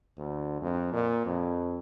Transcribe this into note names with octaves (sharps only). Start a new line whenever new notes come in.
D2
F2
A#2
F2